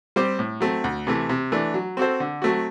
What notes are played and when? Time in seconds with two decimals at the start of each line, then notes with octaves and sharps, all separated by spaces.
0.16 G3 C4 G4 C5
0.39 A2
0.60 F#3 A3 C4
0.84 D2
1.07 C3 E3 A3
1.29 C3
1.52 E3 A3 D4
1.74 F#3
1.97 C4 F#4 A4 C5
2.20 D3
2.42 F#3 A3 C4 F#4